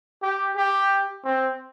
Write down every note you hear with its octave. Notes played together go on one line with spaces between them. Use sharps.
G4
G4
C4